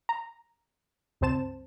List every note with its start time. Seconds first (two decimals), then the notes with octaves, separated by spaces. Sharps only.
0.09 A#5
1.21 C#2 G2 C4 C5 A5 E7